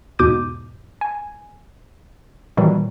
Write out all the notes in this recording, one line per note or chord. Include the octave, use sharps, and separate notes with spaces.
E2 G#2 B2 D6 G6 D#7
G#5
A#2 D#3 E3 F#3 G3